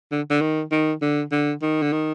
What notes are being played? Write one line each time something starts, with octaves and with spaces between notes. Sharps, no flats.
D3
D3
D#3
D#3
D3
D3
D#3
D3
D#3